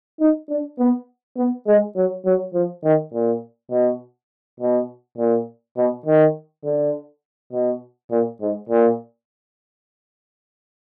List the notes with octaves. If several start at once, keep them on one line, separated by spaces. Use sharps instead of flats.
D#4
D4
B3
B3
G#3
F#3
F#3
F3
D#3
A#2
B2
B2
A#2
B2
D#3
D3
B2
A#2
G#2
A#2